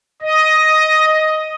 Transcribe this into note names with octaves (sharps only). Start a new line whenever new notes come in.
D#5